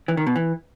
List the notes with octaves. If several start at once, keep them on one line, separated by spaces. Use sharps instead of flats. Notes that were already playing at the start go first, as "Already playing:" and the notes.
E3
D#3
B2
E3